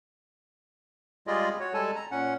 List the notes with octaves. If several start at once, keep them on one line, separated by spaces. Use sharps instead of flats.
G3 G#3 F4 G#4 D5 D#5
F#4 C#5
G3 G#3 A4 G#5 A5
A#5
A#2 C#4 F#5